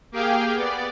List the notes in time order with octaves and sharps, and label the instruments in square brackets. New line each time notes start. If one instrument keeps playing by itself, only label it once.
[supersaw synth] A#3 G4 G#4 F5 G5
B3 D5